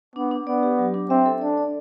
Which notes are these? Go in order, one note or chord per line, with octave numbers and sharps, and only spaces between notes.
B3 D4
D4
B3 D5
G4
F#3
D4
C4 E5
A4
D4 D5
D5